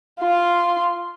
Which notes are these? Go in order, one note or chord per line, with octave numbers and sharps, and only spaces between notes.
F4 C6